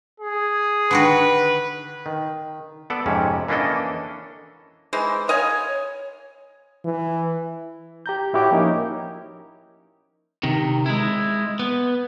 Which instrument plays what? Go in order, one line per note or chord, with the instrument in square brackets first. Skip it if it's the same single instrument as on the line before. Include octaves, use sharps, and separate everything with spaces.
[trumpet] G#4
[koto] D3 D#3 F#4 [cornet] B4
[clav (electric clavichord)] D#3
B3 A4 D5
F2 G#2 C3 C#4
E3 A#3 C#4 D4 A4 D#5
[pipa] E3 G#3 C5
[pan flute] C#5 [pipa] D#5 F5 G#5
[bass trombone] E3
[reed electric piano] G4 A#5 G6
A2 E4 F#4 G4 C#5 D6
F3 A#3 C#4 D#4 E4 A#4
[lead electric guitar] C3 D#3
G#3 E4
B3